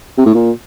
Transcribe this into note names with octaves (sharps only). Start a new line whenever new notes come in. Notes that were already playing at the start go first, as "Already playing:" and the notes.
C3
A2
A#2